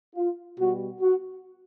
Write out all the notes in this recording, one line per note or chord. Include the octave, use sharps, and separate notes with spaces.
F4
B2 G3 F#4
F#4